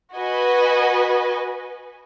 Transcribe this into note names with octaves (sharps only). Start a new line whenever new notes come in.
F#4 B4 D#5 G#5